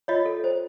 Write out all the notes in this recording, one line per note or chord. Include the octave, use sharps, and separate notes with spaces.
F4 C#5 D#5
A4
C5